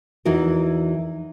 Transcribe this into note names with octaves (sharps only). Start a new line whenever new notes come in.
E2 E3 D#4 F#4 A#4